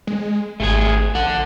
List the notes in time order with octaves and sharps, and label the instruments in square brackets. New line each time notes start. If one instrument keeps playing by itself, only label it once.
[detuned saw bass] G#3
[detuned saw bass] G#1 [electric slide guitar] A3 G#4 G#5
[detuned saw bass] A#1 [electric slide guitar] A4 F#5